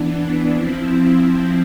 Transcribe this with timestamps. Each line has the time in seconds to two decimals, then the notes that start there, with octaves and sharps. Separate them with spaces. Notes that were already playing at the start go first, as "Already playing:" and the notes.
Already playing: E3 B3 D4
0.53 F3 C4 E4